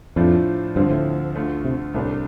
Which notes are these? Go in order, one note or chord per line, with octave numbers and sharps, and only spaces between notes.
F2 A2 F3 A3 D4 F4
D2 G2 D3 F3 C4
A2
D2 D3 A3 F4
C3
C2 A2 C3 A3 D4